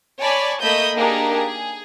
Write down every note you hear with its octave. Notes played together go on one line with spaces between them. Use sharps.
C#5 D5 G#5 A5 B5
A3 A#3 D#5 B5 D#6 G6
A#3 D4 D#4 G4 G#4 A#4
G#4